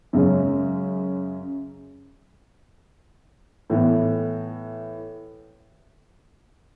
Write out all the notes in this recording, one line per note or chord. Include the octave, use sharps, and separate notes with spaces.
F#2 C#3 G#3 C#4
A2 E3 B3